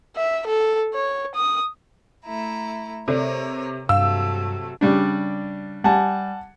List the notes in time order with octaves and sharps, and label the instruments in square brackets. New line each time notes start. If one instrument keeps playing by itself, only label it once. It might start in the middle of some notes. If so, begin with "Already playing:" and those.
[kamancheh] E5
A4
C#5
D#6
[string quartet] A3 E4 A#5
[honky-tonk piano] C3 [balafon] A4 D5 [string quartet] A#4 C#5
[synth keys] G2 [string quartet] C3 F#3 A3 [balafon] F5 [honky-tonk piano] E6
[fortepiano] C#3 G3 D4
[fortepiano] G3 [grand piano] F#5 G#5 A5